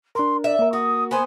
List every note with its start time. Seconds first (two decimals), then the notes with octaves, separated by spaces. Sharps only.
0.15 D4 A#4 C6
0.44 D5 E5
0.59 A#3 A#4
0.73 F#4 D#6
1.11 B3 C5 G#5